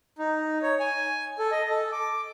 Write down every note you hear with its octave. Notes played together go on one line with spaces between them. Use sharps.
D#4
C#5
G#5
A4
D#5
A4
D6